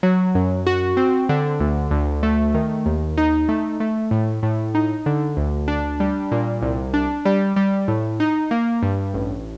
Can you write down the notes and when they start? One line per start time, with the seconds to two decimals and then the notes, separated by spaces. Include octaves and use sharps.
0.03 F#3
0.35 F#2
0.67 F#4
0.97 C4
1.29 D3
1.60 D2
1.91 D2
2.23 A3
2.54 D#3
2.86 D#2
3.17 D#4
3.49 A3
3.80 A3
4.11 A2
4.43 A2
4.75 D#4
5.06 D3
5.37 D2
5.68 D4
6.00 G3
6.32 A#2
6.62 C2
6.94 D4
7.25 G3
7.56 G3
7.88 A2
8.20 D#4
8.51 A#3
8.82 G2
9.14 A1